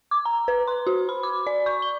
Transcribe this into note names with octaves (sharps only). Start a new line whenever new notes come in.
D6
A#5
B4
C6
F#4
B5
D6
D5
C#6
G7